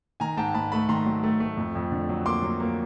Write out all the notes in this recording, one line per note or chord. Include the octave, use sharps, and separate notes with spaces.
D#3 G#5 A#5
G#2 G5 A5
G#2 A5 B5
A3 A5 B5
D#3 A#5 C6
F#3
A3
A3
F2
F2
D3
F#3
A#3 C6 D6
F#3
A#3